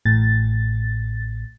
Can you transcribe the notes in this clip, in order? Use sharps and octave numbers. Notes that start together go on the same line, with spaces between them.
A1 A2 A6